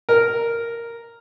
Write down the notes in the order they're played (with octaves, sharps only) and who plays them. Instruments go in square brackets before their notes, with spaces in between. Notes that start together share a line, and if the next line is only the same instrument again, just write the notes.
[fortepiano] A#4